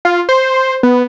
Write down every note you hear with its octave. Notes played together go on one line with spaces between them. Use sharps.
F4
C5
B3